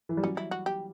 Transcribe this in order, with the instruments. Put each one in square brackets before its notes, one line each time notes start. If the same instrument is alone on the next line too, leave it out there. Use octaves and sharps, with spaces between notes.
[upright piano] E3
G3
[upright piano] F#3 [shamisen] C#4
[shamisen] E4
F#4
G4